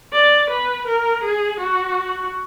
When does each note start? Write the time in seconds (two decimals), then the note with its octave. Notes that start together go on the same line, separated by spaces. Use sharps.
0.13 D5
0.50 B4
0.87 A#4
1.23 G#4
1.60 F#4